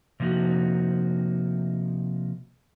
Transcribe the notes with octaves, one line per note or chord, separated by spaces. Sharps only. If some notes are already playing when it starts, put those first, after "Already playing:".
C3 F3 A#3 D#4 F#4